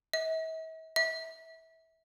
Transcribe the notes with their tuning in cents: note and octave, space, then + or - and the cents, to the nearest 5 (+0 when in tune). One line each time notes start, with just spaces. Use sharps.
E5 -45
E5 -25